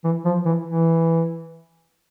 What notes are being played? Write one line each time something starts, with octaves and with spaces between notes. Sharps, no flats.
E3
F3
E3
E3